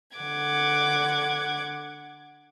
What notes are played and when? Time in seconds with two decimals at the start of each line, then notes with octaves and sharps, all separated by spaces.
0.17 D3 F#5 D6 G#6